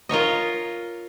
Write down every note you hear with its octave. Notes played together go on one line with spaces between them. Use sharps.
F4 A#4 C#5 D#5